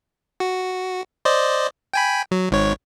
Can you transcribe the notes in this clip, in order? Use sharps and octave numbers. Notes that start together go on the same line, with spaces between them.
F#4
C5 D5 D#5
G5 G#5 B5
F#3
G#1 G#2 C#5